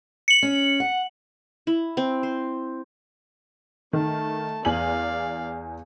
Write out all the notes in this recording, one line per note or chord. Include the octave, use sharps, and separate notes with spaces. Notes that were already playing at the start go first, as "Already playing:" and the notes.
C#7 F#7
C#4
F#5
E4
C4
C5
D#3 A3 A5
E2 D5 F5 G#5 F#7